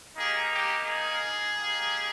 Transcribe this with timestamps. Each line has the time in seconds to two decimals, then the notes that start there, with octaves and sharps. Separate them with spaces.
0.17 A#3 D#4 G4 G#4
0.51 G4
0.85 G#4
1.54 A#3 D#4 G4